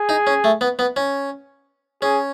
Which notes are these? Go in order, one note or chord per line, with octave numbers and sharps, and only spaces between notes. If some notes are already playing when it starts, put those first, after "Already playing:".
Already playing: G#4
D#4
C#4
A3
B3
B3
C#4
C#4 G#4